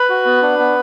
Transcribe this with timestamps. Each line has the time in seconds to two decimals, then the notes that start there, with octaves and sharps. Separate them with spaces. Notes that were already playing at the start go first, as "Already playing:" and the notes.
Already playing: B4 B5
0.09 F#4
0.26 B3
0.42 D4
0.59 B3